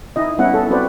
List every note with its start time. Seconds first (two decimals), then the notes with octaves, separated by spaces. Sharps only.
0.16 D#4 E4 D#5
0.38 G3 B3 C#4 E4 F#5
0.54 A4
0.71 C4 F#4 B4 C5 D5